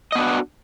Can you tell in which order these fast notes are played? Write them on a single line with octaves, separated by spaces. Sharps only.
D#5 B3 D4 F#4